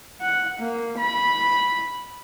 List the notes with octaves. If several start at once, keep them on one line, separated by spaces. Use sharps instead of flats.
F#5
A#3
B5